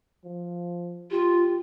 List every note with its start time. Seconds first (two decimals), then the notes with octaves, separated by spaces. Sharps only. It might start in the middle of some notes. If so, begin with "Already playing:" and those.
0.25 F3
1.11 F4 G4